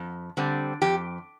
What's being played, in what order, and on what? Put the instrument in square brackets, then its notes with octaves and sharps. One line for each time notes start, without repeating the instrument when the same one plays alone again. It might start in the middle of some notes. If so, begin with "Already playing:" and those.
Already playing: [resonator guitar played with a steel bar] F2
D3 G3 C4
F2 G4